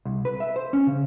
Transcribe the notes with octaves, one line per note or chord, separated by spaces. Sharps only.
C2
B4
E5
C5
C#4
C#3